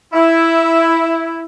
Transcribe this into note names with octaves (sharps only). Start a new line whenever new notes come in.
E4